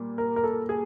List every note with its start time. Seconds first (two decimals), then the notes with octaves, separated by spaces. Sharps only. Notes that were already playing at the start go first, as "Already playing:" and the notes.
Already playing: A#2 G3 A#3
0.18 A#4
0.36 A#4
0.44 A4
0.69 G#4